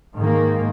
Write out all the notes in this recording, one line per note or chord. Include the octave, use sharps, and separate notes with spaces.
G#2 D#3 A#3